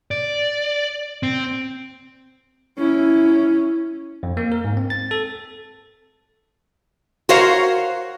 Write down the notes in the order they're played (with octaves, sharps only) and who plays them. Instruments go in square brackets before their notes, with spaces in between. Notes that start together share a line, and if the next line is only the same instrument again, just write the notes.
[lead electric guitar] D5
C4
[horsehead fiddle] C#4 E4
[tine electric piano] F2
A#3
A#4
G#2
C4
A6
A4
[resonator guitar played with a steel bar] F#4 A#4 C5 C#5 F5